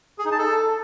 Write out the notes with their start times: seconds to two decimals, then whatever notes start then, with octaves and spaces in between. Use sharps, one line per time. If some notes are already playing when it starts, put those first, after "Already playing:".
0.19 G#4
0.25 D#4
0.32 A5
0.38 A4